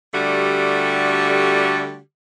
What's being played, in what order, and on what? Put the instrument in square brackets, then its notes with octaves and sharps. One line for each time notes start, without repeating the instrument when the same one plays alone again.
[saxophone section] D3 G3 A3 F#4 G4